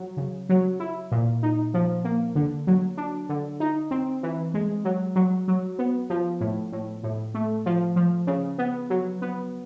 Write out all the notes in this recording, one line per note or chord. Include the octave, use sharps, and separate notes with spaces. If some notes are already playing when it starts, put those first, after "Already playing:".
Already playing: F#3
C#3
F#3
E4
A#2
D#4
F3
A#3
D3
F#3
D4
D3
D#4
C4
E3
G#3
F#3
F#3
F#3
B3
F3
A2
A2
A2
A3
F3
F3
C#3
B3
F#3
B3